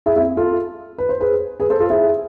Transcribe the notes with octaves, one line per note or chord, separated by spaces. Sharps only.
E4 G#4
C4 E4
F4 A4
B4
C5
G#4 B4
G#4 B4
A4 C5
F4 A4
E4 G#4